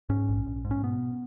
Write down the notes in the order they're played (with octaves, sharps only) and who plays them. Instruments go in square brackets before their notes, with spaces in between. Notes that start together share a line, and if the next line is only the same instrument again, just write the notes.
[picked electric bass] G#2 C#4
A#1
A#1
G#2
C#4
B2 B3